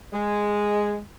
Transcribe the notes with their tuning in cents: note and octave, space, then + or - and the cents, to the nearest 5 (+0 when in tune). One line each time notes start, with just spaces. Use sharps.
G#3 -5